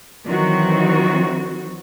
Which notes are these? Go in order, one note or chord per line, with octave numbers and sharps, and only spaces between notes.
D#3 E3 F#3 C4 F#4